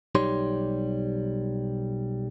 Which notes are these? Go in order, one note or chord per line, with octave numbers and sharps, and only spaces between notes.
B1 G3 D#4 G4 C#5 C6